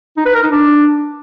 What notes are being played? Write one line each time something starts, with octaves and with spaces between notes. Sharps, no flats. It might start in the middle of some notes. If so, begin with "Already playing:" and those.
D#4
B4
A#4
D#4
D4